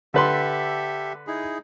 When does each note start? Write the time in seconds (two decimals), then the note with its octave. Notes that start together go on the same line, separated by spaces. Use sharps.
0.14 D3 G4 A4 B4 E5 C6
1.27 D#4 E4 G#4